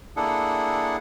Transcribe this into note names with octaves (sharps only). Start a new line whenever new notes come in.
A#3 D4 E4 G#4 A4 F#5